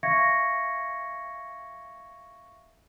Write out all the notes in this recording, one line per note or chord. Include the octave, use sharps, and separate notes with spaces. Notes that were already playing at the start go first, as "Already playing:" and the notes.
E5 F5 C#6 G#6 A#6 C#7